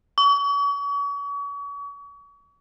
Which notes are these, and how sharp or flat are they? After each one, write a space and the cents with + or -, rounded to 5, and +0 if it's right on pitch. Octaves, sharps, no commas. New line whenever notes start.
C#6 +40